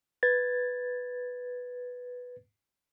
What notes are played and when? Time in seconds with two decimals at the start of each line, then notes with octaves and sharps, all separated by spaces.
0.23 B4 G#6 A6